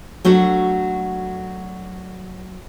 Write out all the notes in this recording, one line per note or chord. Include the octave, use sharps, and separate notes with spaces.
F#3 A3 D4 F#4